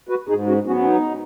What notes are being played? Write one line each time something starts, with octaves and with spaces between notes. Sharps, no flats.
F#4 B4
G#2 D#4 G#4
C#4 F#4
F#3 B3 C#4 F#4
C#4
D#4